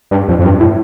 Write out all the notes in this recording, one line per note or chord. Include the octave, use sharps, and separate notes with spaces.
G2
F2
F2
G2
A2